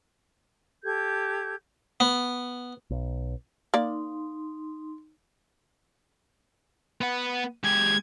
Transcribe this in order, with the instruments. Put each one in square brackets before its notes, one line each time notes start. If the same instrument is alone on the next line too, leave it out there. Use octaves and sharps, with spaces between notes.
[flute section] G4 A4 G6 G#6
[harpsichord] B3
[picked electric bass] B1
[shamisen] A#3 D5 [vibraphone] D#4 C6
[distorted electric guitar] B3 F#5
[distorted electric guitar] G#3 G4 [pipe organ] G#6